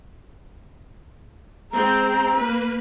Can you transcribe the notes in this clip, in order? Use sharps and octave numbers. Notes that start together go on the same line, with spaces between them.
G#3 C4 A#5
A#3 B4